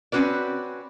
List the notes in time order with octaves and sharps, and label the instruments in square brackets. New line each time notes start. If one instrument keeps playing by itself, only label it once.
[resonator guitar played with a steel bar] C4 C#4 F#4 B4 D5